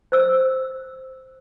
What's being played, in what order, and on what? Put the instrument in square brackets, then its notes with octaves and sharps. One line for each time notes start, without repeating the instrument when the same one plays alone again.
[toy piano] C5 E6